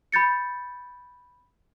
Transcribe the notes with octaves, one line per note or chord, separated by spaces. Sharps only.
B5 G6 A6 C#7